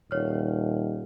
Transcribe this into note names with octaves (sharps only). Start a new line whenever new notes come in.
D#1 C#5 F6